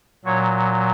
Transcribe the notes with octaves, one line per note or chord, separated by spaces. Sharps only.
A#2 F#3 C#5